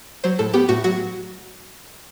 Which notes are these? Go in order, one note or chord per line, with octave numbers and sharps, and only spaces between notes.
F#3 C5
A2 A4
B3 G4
A2 F#4
F#3 F#4